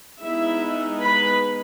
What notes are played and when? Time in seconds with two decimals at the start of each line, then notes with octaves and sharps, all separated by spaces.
0.23 G#3 B3 D#4 E4 E5
1.01 B4 B5